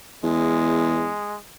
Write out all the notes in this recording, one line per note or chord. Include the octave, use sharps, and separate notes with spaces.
E2 G#3